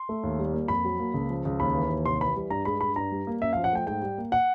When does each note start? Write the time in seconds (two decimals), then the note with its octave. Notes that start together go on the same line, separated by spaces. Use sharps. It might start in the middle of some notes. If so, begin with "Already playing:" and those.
Already playing: C6
0.09 A3
0.23 D#2
0.39 G3
0.53 A#3
0.68 F2 B5
0.85 F#3
1.00 A#3
1.14 C#2
1.30 F3
1.45 C#2
1.60 D#2 B5
1.74 E3
1.90 D#2
2.06 C2 C6
2.20 E3 B5
2.36 G3
2.50 G2 A#5
2.65 G#3 B5
2.81 G2 B5
2.96 G2 A#5
3.12 G3
3.27 A#3
3.41 F#2 E5
3.53 F5
3.57 F3
3.64 F#5
3.73 A3 G5
3.87 G#2 G5
4.02 G3
4.18 A#3
4.32 F#5